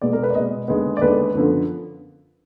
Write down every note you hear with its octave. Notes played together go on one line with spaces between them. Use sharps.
B2 G#3 B3 D5
A#4
B4
D5
B2 G#3 B3 D#5
D#2 D3 G#3 B3
D5
D#2 D3 G#3 B3 B4
F#2 D3 F3 B3